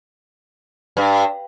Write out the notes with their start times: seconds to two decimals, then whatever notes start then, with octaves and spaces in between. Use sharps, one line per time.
0.97 G2